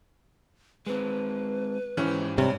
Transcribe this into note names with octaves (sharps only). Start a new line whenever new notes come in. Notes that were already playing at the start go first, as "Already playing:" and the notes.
G#3 C4 B4
G#2 E3 C#4 G4 C5
G2 C3 C#5